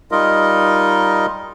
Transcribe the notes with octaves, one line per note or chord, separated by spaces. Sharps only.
G3 D#4 F4 A#4 D#5